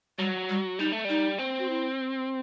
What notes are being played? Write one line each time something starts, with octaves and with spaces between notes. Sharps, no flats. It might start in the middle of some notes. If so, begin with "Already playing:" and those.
F#3 G3
G3
G3 D#4
A3
G3 D#4
C4
F#4
E4